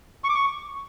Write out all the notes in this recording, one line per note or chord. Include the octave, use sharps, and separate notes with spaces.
C#6
D6
C#6